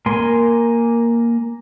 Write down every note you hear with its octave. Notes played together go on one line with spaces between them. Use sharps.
A#3 A#4 G#5 C6